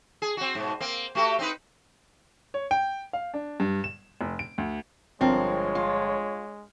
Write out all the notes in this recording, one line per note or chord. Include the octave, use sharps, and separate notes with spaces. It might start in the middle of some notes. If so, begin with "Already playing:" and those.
G#4
C4 F#4
G#2 B2
A#3 C4
A3 F#4 G4
C4 D#4 B4
C#5
G5
F5
D4
G2
E7
F1
D7
D2
G1 F3 G#3 C4 A#4 C#5
F4